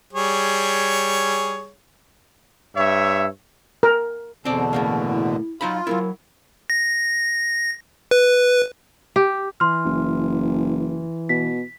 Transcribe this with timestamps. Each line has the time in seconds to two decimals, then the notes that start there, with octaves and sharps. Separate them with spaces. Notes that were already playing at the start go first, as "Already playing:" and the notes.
0.13 G3 G#4 C#5
2.76 G2 C#5 E5
3.83 A#4
4.45 E2 B2 D3 C4 D5 A5
4.73 A2 C#3 A#3
5.09 E4
5.61 F#3 D#4 F4 F5 B5
5.87 F#3 A3 E4 A#4
6.70 A#6
8.11 B4
9.16 G4
9.60 E3 C6 F6
9.85 F#1
11.29 B2 B6